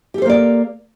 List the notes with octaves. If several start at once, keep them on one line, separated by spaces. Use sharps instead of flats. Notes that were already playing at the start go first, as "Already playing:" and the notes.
A#3 G4 A4 C5 D5